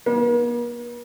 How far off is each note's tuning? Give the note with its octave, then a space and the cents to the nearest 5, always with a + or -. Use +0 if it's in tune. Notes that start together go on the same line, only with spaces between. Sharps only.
A#3 +45